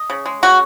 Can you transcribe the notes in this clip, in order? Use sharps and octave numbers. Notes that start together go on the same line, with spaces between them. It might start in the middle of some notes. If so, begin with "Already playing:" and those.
Already playing: D#5
C#3
G#3
C#3 F#4